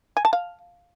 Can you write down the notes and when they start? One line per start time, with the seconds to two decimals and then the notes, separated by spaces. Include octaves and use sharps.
0.17 G#5
0.25 A5
0.33 F5